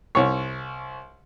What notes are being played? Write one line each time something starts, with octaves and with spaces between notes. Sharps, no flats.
C2 C#5